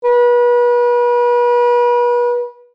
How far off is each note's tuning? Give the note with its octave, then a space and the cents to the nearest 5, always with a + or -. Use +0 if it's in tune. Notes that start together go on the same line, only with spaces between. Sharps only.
B4 -35